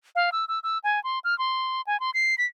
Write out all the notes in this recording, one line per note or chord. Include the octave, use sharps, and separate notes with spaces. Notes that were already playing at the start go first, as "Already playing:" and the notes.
F5
E6
E6
E6
G#5
C6
F6
C6
G#5
C6
C7
B6